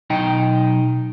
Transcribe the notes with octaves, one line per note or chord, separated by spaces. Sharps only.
B1 D#4 D#5 G5